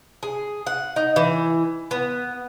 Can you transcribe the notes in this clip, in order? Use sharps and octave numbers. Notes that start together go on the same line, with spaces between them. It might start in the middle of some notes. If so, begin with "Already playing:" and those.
G#4
F#5
D#4
E3
B3